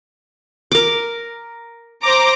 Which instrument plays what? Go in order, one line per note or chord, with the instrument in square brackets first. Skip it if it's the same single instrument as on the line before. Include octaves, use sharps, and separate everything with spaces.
[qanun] A#4 D6
[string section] C5 A#5 D6